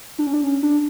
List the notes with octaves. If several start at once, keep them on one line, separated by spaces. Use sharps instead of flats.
D4
C#4
D4
C#4
D4